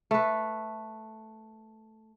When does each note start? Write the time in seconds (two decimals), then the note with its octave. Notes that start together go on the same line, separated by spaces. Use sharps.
0.11 A3 B4